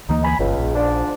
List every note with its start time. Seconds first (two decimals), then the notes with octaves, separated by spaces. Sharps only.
0.09 D2 E3 A#3 D#4
0.24 G#5 B5
0.39 G1 C#2
0.58 A#1
0.75 G#2 F3 D4